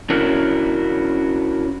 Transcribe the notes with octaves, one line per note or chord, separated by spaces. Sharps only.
C#4 D4 E4 F#4 A#4 C#5